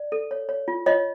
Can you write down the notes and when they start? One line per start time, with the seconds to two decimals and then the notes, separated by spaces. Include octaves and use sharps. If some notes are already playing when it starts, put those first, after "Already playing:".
Already playing: D5
0.12 A4
0.31 C#5
0.49 C#5
0.68 F4
0.86 F4 C#5 D#5